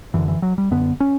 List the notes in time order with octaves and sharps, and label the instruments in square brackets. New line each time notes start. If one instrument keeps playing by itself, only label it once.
[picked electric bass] F#2 D3 E3
E3
F#3
G3
F#2 D3 B3
C#4